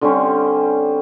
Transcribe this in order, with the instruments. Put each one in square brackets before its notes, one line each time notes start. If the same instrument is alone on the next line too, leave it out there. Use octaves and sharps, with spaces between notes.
[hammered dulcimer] D3 G3 C4 C#4